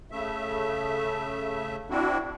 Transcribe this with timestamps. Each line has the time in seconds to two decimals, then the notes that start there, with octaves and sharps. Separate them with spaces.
0.11 C#3 A3 E5
1.90 C4 D4 E4 F#4